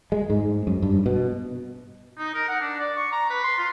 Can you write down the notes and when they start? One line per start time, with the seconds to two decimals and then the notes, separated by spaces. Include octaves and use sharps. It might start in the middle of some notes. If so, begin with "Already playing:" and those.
0.12 G#3
0.30 G#2
0.67 F#2
0.82 G2
1.06 B2
2.18 D#4
2.35 A#4
2.48 F#5
2.61 D4
2.79 D5
2.96 C#6
3.12 A#5
3.30 B4
3.44 C6
3.58 F4